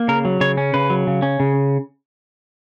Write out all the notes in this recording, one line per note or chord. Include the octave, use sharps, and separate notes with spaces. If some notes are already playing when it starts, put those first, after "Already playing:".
Already playing: A#3
C#3 A#4
F#3
C#3 C#5
C#4
C#3 B4
F#3
C#3
C#4
C#3